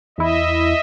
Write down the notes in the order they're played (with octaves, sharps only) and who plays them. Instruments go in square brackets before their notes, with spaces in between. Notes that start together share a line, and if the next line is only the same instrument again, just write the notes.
[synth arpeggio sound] E2 E4 [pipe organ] D#5 E5